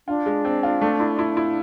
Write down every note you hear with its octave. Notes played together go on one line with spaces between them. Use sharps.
D4 F4
G#3
C4
F4
A3
E4
E4
E4